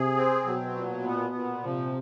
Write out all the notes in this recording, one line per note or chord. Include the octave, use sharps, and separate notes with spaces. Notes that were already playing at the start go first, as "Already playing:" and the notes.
Already playing: C3 G#4
C4
B2 F#3
A#2
B3
A#2
C3 F3